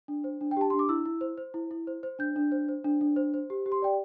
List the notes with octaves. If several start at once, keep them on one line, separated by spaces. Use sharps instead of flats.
D4
C5
D4
G5
G4 A5
D4 C6
D6
E4 E6
E4
C5
C5
E4
E4
C5
C5
D4 G6
D4
C5
C5
D4
D4
C5
C5
G4
G4
C6
D5 G5